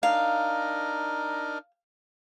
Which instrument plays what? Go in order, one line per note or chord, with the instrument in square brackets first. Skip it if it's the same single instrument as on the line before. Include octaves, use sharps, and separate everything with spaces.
[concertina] D4 D#4 A#4 [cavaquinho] F5